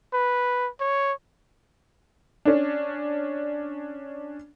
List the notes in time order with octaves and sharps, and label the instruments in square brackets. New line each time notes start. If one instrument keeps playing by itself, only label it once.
[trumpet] B4
C#5
[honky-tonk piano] C#4 D4